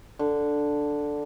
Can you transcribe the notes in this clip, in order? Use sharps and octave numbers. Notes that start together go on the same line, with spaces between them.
D3